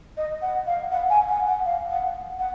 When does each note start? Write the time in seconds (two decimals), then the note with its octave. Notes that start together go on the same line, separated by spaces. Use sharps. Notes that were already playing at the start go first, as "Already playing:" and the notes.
0.17 D#5
0.42 F#5
0.66 F5
0.91 F#5
1.10 G#5
1.28 F#5
1.47 F#5
1.65 F5
1.90 F#5
2.39 F#5